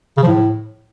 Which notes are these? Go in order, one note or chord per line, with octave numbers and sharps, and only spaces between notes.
C#3
F3
A2